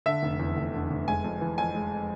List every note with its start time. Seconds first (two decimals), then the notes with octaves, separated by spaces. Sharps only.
0.06 D3 E5
0.23 F1
0.39 E2
0.57 F1
0.74 D3
0.91 F1
1.07 G#3 G#5
1.24 F2
1.41 E3
1.58 F2 G#5
1.75 G#3